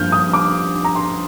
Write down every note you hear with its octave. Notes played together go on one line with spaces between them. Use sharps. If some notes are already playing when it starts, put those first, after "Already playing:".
Already playing: G2 F3 A#3 F6 G6
D#6
D6
A#5
C6